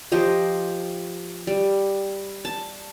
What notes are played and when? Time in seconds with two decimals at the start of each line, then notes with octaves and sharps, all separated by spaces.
0.12 F3 G4 C5 D#5
1.47 G3
2.45 A5